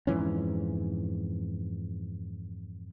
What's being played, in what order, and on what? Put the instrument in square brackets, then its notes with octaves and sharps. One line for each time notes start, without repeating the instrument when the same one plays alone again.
[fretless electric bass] F2 G#2 E3 C#4